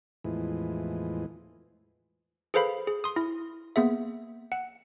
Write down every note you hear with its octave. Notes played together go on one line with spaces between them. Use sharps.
E2 A2 E3 F3 G#3
G#4 A4 B4 C5 F5 B5
G#4
C6 D#6
E4
A#3 B3 G#4 E5
F#5